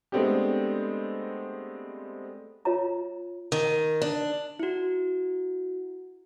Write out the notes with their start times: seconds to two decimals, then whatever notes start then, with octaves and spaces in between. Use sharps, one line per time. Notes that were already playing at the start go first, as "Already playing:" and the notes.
0.12 G#3 A3 B3 C4 D4 G4
2.65 F4 C#5 E5 A#5
3.52 D#3
4.02 D4
4.60 E4 F#4